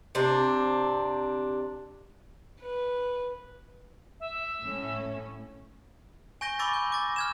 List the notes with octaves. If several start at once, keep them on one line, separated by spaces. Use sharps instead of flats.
C3 C4 D4
B4
E5
A2 C#4
G#5 C#6 G6 A#6 D#7 G7
B5 C#6 D6 E6 A6 A#6
G6
D6 A6 A#6
F6 G#6 E7